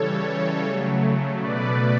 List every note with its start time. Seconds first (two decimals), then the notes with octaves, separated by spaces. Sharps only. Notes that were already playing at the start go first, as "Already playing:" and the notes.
Already playing: C#3 E3 G3 A4 C#5
0.62 C#3 F#3 A3
1.37 B2 A3 B4 D5